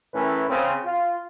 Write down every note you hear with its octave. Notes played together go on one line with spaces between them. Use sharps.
A2 E3 C#4 E4 A#4 B4
C#3 C4
F4